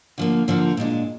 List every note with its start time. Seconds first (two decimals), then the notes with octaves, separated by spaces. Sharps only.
0.18 D3 F3 A#3
0.48 D3 F3 A#3
0.77 A#2 G#3 D4